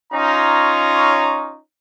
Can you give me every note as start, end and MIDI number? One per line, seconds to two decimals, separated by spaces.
0.13 1.57 61
0.13 1.57 63
0.13 1.57 65
0.13 1.57 73
0.13 1.57 82